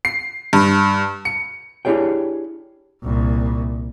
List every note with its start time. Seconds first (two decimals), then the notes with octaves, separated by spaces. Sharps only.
0.05 C7
0.53 G2
1.25 C#7
1.85 D4 E4 G4 G#4 C#5 G5
3.03 C2 A#2